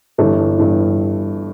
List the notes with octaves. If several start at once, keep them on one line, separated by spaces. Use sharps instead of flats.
G1 G2 E3 A4
G1 G2 E3